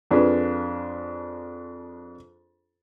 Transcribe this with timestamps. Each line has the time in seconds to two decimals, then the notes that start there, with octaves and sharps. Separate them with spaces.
0.11 F2 D4 F4 G#4 B4